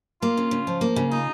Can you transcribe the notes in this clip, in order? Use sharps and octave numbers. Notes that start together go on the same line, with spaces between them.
A#3 F4
C#3
C#3
F3
A#3
C#3
D#4 F4